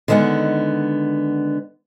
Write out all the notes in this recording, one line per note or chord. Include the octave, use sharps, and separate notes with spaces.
D3 D#3 G#3 B3 F#5